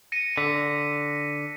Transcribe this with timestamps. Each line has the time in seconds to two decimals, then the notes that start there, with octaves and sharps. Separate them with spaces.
0.12 A#6 C#7 D#7
0.38 D3 B6